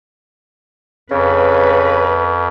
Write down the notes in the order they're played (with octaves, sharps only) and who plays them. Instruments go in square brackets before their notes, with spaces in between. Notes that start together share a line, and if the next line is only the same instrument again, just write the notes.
[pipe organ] F2 [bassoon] C#3 [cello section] B4